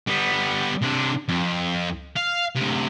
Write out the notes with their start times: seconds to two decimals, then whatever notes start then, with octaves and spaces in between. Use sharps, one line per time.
0.07 G3 B3
0.82 C3 D4
1.29 F2
2.17 F5
2.56 D2 C3